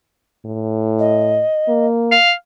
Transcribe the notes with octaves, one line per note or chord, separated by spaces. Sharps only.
A2
D#5
A#3
F5